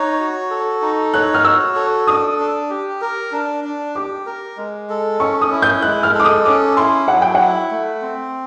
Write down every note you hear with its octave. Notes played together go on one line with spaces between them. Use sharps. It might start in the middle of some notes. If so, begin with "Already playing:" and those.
Already playing: D#4 C#5 F#6
F#4
A4
D#4
C#5 F#6
F6
F#4 E6
A4
D4 D#6
D4
G4
A#4
D4
D4
G4 D6
A#4
G#3
A4
C#4 C#6
D#6
E4
G6
G#3 F#6
F6
A4
D6
D#6
C#4 D6
E4 C6
F#3 F#5
G5
E4 F#5
A3
C4